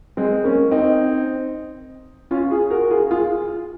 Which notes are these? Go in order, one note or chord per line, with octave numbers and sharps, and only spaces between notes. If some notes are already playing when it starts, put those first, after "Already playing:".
G#3 C4
A#3 C#4
C4 D#4
C#4 F4
F4 G#4
F#4 A#4
F4 G#4
F4 G#4